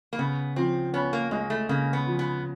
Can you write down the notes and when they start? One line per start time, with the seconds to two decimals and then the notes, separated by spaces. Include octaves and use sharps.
0.13 A#3
0.19 C#3 B3
0.56 F3 C4
0.93 B3 C#4
1.13 A#3
1.31 G#3 A#3
1.50 A3
1.69 C#3 A#3
1.93 B3
2.06 F3
2.19 B3